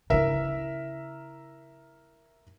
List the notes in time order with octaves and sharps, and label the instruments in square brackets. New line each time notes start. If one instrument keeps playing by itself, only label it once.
[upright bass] C#3 E4 [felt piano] A#4 E5